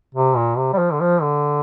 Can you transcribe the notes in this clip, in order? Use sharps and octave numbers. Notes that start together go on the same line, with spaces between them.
C3
A#2
C3
G3
F3
D3
F3
D3